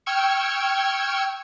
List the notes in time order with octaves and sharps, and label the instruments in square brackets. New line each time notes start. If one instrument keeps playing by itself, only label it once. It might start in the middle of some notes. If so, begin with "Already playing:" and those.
[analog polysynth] G5 C#6 E6 F6 G#6 C#7